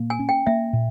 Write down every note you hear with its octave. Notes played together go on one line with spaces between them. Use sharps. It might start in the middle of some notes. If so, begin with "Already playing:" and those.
Already playing: A#2 A#3
G#5
C#4
G5
A#3 E5
A#2